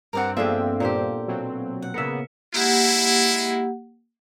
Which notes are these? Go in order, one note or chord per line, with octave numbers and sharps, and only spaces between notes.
G2 C4 A#4 D5 F#5
F3 A#3 B3 D4 G#4 A4 E5 G5
A#2 G4 A#4 C5
B2 F#3 C4
F#5
C#3 A#3 B3 A#4 E5 C#7
G#3 A#3 E4 G4 F#5